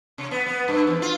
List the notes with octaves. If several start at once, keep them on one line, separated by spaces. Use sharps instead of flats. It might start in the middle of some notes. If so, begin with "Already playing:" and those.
C3
B3
B3
G2
E2
F4